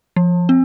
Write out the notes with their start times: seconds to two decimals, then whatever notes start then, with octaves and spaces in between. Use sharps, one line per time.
0.16 F3
0.49 C4